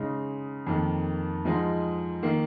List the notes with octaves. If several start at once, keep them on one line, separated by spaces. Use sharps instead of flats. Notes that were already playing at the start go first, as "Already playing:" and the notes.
Already playing: C#3 G#3 D#4
F2 D#3 A#3
G#2 F3 G#3 D#4
D#3 A#3